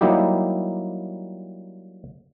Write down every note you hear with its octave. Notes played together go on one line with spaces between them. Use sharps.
F#3 G3 A#3 D#4 E4 G4